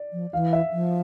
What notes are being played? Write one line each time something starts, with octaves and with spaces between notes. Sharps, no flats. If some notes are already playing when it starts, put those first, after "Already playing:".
Already playing: D5
F3
E3 F5
E5
F3